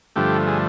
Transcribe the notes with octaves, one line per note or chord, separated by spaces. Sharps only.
G2 D3 F3 A3 G4
G#4